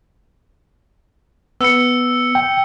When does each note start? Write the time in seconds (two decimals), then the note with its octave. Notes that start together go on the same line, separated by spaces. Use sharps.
1.61 B3 E6 C#7
2.35 G5